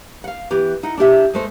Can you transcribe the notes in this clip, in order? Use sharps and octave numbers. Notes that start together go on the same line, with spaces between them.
F5 F#5
E3 B3 G4
D#4 E4 F#5
D4 E4 G4 E5
G#3 A3 C5